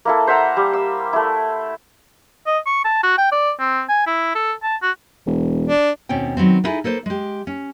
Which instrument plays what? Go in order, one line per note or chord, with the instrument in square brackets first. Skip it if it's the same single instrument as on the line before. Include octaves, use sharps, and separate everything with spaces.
[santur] A#3 E4 A4
C5 E5 F#5 A#5
G3
E6
A3 E4
[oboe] D#5
C#6
A5
F#4
G5
D5
C4
G#5
E4
A4
A5
F#4
[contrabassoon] E1
[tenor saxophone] D4
[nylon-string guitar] D#2 B2 C4 C#4 G5
D#3 F#3 B3 C4
B3 D#4 E4 G#4 A4
A#3 A4 B4 C5
G#3 G4
C#4